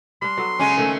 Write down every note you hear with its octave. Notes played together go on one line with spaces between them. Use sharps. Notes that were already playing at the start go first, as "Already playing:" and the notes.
G3 D4 C6
F#3 B3 A4
C#3 G#3 C#4 G#5
D#3 A3 C4